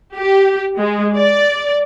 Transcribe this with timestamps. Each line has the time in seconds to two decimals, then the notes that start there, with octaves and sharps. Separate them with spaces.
0.16 G4
0.79 G#3
1.17 D5